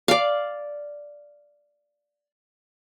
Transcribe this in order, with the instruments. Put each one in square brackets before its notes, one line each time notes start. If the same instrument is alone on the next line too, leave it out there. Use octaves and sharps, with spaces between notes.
[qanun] D5 F5